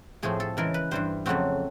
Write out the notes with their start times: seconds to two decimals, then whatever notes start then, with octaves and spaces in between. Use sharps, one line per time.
0.23 A2 F3 A3 C4 G#4
0.40 A4
0.57 C#3 E3 G#3 A#4
0.74 B4
0.91 G2 E3 G3 C5
1.26 F2 C#3 F#3 A3 C4 F#4